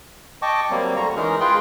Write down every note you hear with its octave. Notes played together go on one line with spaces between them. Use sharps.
D#5 G5 A5 C#6 D6
F#3 G3 A#3 C4
D2 D3 A#5 C#6
E3 G#3 C#4 D#4 G#4 A#4
G#3 F4 G#4 B4 G5 C6